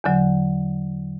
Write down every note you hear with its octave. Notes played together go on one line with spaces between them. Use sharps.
E2 D3 F#3